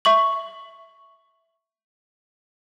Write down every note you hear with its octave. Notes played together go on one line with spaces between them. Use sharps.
E5 C#6 F#7